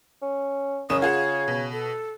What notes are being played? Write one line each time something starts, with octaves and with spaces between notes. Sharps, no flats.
C#4
F#1 C#3 C#4 D#6 E7
F4 G#4 F#5 G#6
B2
A4